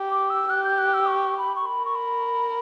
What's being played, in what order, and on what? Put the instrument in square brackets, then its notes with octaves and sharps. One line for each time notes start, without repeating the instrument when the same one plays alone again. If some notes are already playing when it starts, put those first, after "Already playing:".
Already playing: [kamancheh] G4
[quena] D6
E6
[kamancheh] G4 [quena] F#6
[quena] G6
F#6
E6
C#6
B5
C#6
[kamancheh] A#4 [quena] B5
[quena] C#6
B5